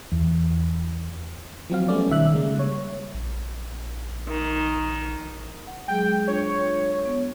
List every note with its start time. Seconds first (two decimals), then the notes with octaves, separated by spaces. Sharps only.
0.12 E2
1.70 F3 F#3 C4 F#4 F5
1.88 G3 A3 B3 C#4 D5
2.09 B1 D#3 E5 F#6
2.33 C#3 G#3 A#3
2.55 G3 C#5
3.14 A#1
4.28 D#3
5.67 F#5
5.88 F#3 G#3 G#4 G5
6.28 D4 F4 C#5
7.05 B3 C#5